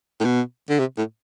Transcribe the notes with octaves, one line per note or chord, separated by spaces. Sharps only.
A2
B2
D3
C3
A2